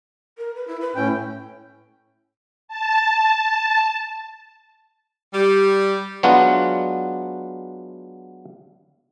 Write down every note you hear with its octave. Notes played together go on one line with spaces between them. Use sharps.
A#4
B4
E4
B4
A2 C#4 E4 G5
A5
G3
F#3 G#3 B3 D4 F4 F#4